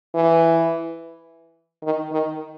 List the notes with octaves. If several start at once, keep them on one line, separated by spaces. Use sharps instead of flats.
E3
D#3
D#3